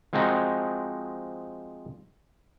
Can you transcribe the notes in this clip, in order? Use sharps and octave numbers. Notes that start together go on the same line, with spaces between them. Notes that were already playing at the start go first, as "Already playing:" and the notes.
F3 G#3 C4 D#4 F#4